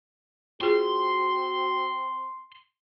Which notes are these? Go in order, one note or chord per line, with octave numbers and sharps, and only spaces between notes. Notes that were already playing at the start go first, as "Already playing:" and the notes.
C4 F4 F#4 G#4 C6